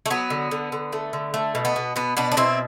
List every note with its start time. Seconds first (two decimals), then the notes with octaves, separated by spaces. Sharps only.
0.06 A3
0.10 F#3 B3
0.30 D3
0.51 D3
0.72 D3
0.93 A3
1.13 D3
1.34 A3
1.55 B2
1.65 B3
1.76 B2
1.96 B2 B3
2.17 B2 B3 D4
2.32 D4
2.37 B2 C4 E4